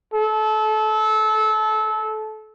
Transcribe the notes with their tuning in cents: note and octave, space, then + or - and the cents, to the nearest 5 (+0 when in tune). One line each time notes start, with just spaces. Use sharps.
A4 -25